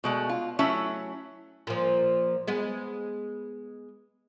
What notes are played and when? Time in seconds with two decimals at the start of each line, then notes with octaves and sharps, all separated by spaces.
0.04 B2 G#3 A3
0.29 F4
0.59 F#3 A3 C#4 E4 E5
1.67 A#2 F3
2.48 G#3 B3